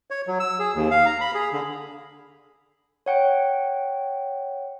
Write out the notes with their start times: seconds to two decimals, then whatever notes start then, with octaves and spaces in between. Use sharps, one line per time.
0.11 C#5
0.27 F#3
0.40 E6
0.59 G#4
0.75 D#2
0.91 F5
1.06 A#5
1.21 B5
1.34 G#4
1.52 D3
3.06 C#5 F#5 G5